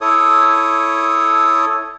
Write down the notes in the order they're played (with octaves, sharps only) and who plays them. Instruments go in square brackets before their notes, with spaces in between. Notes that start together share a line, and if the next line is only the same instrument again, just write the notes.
[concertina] E4 A4 C#5 D#6